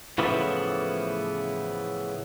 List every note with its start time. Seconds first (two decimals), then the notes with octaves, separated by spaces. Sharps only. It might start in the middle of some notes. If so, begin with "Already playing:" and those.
0.18 A2 C#3 E3 F3 B3 E4